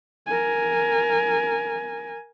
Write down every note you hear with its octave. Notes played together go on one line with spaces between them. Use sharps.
A#4 G#5